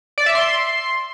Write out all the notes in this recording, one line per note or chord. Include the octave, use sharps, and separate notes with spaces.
D5
E5
C6